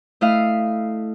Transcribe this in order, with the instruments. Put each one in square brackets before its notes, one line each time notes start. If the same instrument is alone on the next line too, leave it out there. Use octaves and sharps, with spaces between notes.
[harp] A3 E4 D#5 F5